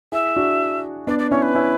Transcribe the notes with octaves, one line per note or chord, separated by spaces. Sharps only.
E4 G#4 E5
D4 F#4
B3 D4 D5
D5
C#4 E4 C#5
B4
C#4 E4